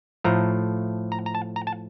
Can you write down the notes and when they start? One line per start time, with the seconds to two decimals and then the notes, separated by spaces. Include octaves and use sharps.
0.24 A2 F3 A3 A#5
1.12 A#5
1.26 A#5
1.35 A5
1.56 A#5
1.67 A5